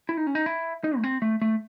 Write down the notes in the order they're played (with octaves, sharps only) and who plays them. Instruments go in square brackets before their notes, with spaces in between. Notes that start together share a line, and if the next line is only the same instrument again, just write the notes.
[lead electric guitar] E4
D#4
C#4
D#4
E4
D#4
A3
C4
A3
A3